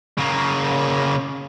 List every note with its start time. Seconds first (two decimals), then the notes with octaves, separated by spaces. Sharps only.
0.18 C#3 A#3